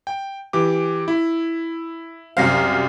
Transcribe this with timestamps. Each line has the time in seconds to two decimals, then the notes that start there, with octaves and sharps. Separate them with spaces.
0.07 G5
0.53 E3 G4 D6
1.08 E4
2.37 C2 F#2 C5 F5 A#6